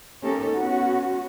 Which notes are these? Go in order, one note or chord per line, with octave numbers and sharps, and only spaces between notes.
A#3 C#4 D#4 G4 A4
B3 C#4 F#4